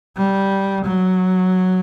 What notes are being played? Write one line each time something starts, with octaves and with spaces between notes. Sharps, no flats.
G3
F#3